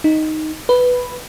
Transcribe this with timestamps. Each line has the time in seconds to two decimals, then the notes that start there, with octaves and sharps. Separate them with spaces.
0.04 D#4
0.69 B4